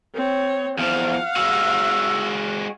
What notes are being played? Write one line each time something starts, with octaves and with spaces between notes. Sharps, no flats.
C4 C#5
E2 F3 F5 F#5
G#3 F#4 E6